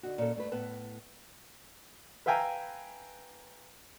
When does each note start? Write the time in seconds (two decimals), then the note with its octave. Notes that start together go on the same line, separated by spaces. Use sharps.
0.03 D3 D#4 F#4
0.18 A#2 C#4 D#4 A4
0.35 G2 A3 B4
0.52 A2 B3 B4 A5
2.26 B4 E5 F5 G5 G#5 A#5